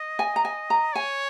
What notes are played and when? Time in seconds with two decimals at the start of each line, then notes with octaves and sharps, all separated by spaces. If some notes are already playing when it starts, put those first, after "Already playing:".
Already playing: D#5
0.19 G#5
0.36 A#5
0.45 G#5
0.70 A#5
0.95 C#5 G#5